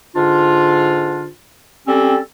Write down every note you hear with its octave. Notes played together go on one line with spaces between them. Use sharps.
G#2 D3 D4 F4
G3 C4 C#4 G4 A4